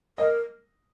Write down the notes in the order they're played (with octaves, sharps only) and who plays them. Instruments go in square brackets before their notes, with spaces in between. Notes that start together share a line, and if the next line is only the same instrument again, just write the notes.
[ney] A#4 [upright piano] D#5